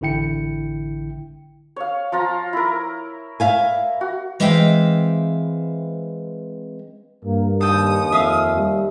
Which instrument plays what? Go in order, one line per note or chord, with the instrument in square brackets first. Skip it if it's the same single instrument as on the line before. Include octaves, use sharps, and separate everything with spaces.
[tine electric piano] A1 D3 E4 G5 C#7
[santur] C#5 F5
F3 F4 A#5
E4 A#4
[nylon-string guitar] E5 F5 G#5
[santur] F#4
[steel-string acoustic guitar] E3 G#3 C4 E5 F5 G5
[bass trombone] G2 [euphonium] A#3
[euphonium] D#2 [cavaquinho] A4 G5 [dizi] D#6
[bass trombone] F2 [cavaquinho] E5 F5
[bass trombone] G3